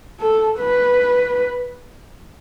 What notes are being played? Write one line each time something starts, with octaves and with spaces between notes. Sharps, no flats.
A4
B4